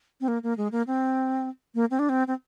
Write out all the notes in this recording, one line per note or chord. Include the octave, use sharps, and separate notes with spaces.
C4
A#3
A#3
G#3
A#3
C4
A#3
C4
D4
C4
C4